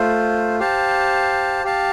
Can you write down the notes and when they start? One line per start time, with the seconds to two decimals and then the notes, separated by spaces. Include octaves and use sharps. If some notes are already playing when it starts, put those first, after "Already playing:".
Already playing: A3 F4 C5
0.60 G4 C5 F5 A5
1.64 G4 F5 A5